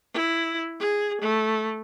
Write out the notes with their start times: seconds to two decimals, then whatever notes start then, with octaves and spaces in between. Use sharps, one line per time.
0.14 E4
0.80 G#4
1.21 A3